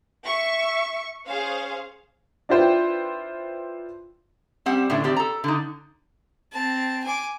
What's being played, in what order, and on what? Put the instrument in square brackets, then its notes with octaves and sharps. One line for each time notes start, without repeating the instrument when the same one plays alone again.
[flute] E5 [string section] C#6
[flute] C#4 [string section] G#4 C5 F5
[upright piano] D4 E4 F4 B4 C5 G5
[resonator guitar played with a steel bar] G3 C4 F#5
A2 D3 D4
D#3 C4 G4 D5
A4 A#5
D3 D#4
[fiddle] C4 A5
G#5 D6